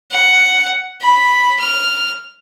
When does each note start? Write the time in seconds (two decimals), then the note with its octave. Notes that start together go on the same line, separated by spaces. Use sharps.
0.11 F#5
1.01 B5
1.60 F6